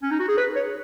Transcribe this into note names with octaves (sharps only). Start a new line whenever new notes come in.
C#4
D#4
F#4
G#4
B4
C#5